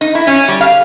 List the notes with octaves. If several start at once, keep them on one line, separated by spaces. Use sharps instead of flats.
D#4
E4
C#4
G3
F5